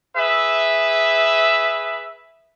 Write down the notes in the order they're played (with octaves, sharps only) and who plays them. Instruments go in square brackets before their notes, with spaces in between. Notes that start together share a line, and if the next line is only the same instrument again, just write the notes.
[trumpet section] G#4 B4 E5